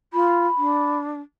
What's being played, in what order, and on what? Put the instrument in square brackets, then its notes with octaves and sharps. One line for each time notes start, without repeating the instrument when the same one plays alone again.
[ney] F4 [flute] B5
[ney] D4